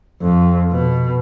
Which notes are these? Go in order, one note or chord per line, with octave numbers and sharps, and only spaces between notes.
F2
B2